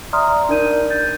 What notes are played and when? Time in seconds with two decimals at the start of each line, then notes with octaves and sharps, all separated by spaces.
0.13 D5 E5 A#5 C6 D#6 F6
0.49 D4 D#4 A#4 D5 G6 D#7
0.90 G6 A6